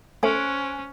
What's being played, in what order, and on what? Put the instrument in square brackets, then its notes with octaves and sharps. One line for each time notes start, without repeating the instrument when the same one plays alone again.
[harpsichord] A3 [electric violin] C#4 [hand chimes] C5 G#5